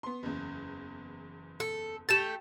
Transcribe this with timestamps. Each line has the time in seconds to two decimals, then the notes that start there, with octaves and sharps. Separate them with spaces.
0.03 B3 C6
0.23 F#1 E2
1.60 A4
2.09 A3 G4 A4 A6 E7